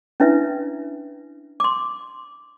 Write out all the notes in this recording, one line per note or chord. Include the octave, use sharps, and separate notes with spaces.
C#4 D4 E4 B4 E5
C6 D6